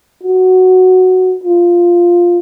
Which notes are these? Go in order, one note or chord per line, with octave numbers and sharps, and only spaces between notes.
F#4
F4